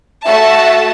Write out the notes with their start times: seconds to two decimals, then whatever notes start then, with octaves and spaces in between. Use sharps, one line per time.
0.25 A3 F#4 E5 A5